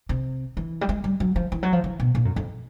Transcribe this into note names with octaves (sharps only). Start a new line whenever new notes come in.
C3
E3
G3
G#3
G3
F#3
F3
E3
F#3
F3
E3
B2
A#2
F#2
F2